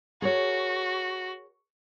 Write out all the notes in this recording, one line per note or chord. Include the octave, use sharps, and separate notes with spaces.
F#4 G#4 A#4 C#5